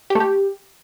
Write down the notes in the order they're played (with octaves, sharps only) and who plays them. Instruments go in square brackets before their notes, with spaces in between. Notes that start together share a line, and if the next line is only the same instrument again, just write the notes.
[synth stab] G4
A3
G4